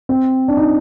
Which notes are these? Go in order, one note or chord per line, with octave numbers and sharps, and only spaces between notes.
C4
D4
D#4